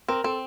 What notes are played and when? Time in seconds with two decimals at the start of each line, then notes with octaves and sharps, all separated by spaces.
0.08 C4 A#4
0.24 C4 A4